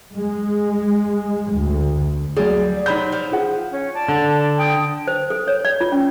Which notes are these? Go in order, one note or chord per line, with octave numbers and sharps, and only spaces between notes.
G#3
D2
F#3 G3 G#4
C3 F#3 D#4 B5 G6
F3
F4 G#4 F#5
C#4
D5 A5
D3
G5 D#6
C5
A4
C#5
D5
F4
C#4